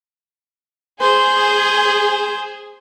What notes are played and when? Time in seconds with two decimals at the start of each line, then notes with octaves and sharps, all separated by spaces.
1.01 G#4 C5